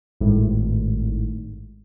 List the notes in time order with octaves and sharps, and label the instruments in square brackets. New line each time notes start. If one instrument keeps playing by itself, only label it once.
[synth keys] G#1 A2